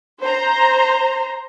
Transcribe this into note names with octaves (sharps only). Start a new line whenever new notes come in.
C5 A#5